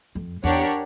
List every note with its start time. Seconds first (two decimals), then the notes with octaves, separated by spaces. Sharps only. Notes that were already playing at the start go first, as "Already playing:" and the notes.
0.15 F2
0.44 E2 D4 G4 A#4 C#5 F#5